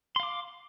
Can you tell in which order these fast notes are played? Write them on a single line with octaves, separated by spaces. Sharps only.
C6 F5 D6